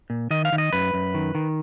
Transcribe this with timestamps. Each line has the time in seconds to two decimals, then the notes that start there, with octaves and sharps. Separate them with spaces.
0.10 A#2
0.31 D#3 D#5
0.45 F5
0.52 D#3
0.58 D#5
0.73 F#2 B4
0.94 F#2
1.14 D#3
1.35 D#3